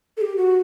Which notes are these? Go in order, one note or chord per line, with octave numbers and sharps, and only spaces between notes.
A4
G4
F#4